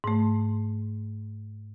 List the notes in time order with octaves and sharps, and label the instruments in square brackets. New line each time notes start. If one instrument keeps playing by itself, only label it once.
[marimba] G#2 A3